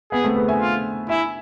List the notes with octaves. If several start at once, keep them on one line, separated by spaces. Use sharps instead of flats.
B3 G#4
A3 C4
G#4 B4
E5 G#5
F4
E4 E5 G#5